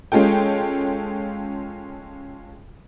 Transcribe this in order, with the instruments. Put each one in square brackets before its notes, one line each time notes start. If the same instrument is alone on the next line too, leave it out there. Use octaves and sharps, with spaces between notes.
[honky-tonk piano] G#3 C#4 F4 A4 G5